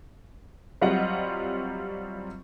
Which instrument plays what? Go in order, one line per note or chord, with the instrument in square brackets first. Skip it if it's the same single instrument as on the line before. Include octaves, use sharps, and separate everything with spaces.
[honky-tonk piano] F#3 G3 C4 F4 D#5 F#5